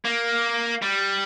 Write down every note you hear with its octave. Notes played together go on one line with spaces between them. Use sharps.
A#3
G3